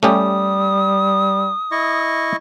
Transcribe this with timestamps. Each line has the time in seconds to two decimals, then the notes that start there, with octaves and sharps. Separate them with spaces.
0.03 G3 A3 C#4 G4 D#6
1.72 E4 D#5 C#6